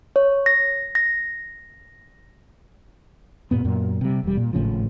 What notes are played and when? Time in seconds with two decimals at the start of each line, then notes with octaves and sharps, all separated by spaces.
0.16 C#5
0.46 A#6
0.95 A#6
3.51 G2 A#2 B3
3.65 F#2 A#2
4.01 C3 G3
4.23 E1 G3
4.37 A#2
4.53 G#1 A2 C#3 F3